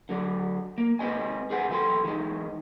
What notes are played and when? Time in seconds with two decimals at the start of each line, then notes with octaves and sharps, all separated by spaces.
0.09 D3 F#3 D4
0.78 A#3
0.99 G#3 C4 B4 D#5 G#5
1.50 G#4 B4 C5 F#5 G#5
1.69 B1 E3 E4 G4 A4 C6
2.04 E3 G#3 D#4